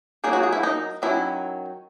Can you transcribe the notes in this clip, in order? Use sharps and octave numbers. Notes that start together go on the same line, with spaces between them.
F#3 A#3 D#4 G#4
F#4
G#4
E4
D#4
D#3 F#3 C#4 E4